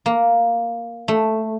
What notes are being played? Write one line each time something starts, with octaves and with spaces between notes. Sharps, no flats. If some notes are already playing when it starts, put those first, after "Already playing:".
A#3
A3